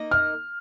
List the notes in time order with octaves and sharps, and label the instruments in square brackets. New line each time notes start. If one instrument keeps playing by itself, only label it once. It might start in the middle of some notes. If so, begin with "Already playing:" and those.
Already playing: [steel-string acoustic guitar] A#3 D#4 A#4 D#5
[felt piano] F6